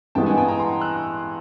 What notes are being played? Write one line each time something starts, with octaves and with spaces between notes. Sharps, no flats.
G2 E3 G#3 B3 E4 G5 A5
F#5 G#5
G5 A5
G#5 A#5
A#5 C6
E6 F#6